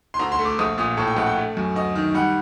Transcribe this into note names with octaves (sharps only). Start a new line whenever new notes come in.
C6
D2 A#5
C6
A3
D6
A#1 D#6
A#2 D#6
A2 A5
G5
A#1 F#5
G5
A3
F#2
D2 D#5
D#3
G3 F#5